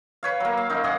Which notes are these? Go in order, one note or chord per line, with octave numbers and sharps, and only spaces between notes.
B4 C#5 F5
F#3 A#3
F5
F#2 D#4
G#4 D5 F#5